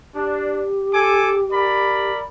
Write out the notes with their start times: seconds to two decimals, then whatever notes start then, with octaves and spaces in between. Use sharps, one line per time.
0.15 D4 G4
0.94 A4 G#5 D6
1.51 A#4 D5 B5